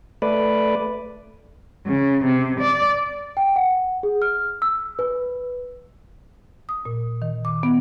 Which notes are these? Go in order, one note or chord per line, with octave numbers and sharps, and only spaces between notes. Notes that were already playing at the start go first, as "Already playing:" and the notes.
A3 B4 D5
C#3
C3
D5
G5
F#5
G#4
F6
E6
B4
D#6
A#2
D#3
D6
B3